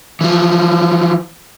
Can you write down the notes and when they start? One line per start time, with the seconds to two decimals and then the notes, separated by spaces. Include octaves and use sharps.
0.21 E3 F3